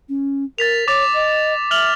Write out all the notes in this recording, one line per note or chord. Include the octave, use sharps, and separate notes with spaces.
C#4
A#4 A6 B6 F7
C#5 D6 A6 F7
D#5
E5 F6 F7 F#7